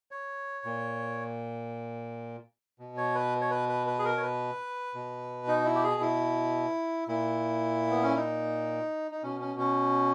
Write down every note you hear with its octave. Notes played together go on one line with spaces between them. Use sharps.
C#5
A#2
B2
C#5
B4
C#5
B4
B4
B4
G#4
A#4
C#5
B4
B2
D#4
E4
G4
G#4
E4
A#2 E4
B3
C#4
D#4
D#4
B2 C#4
C#4
C#4